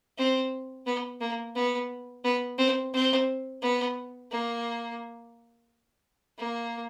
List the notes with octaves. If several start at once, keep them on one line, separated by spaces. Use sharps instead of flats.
C4
B3
A#3
B3
B3
C4
C4
B3
A#3
A#3